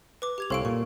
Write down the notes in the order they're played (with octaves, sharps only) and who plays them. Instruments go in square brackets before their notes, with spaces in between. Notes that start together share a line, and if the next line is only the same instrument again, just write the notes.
[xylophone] B4 D6
G4 G#6 F7
[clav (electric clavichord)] C2 C4 C#5 [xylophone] A4 F5 D7
[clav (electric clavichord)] A#2 [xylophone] C#6